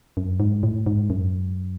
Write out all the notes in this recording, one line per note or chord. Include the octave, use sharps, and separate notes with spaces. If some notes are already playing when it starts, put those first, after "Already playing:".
F#2
G#2
A2
G#2
F#2